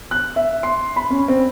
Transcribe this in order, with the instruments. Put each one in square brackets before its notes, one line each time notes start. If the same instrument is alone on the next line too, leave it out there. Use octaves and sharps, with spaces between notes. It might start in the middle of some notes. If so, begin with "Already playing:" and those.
[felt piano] F#6
E5
C6
B5
C#4
C4